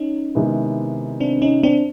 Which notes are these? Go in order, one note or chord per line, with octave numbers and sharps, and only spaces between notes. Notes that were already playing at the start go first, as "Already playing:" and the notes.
Already playing: C#4 D#4
C3 D#3 G#3 B3 E4
C4 D4
C#4 D#4
C4 D4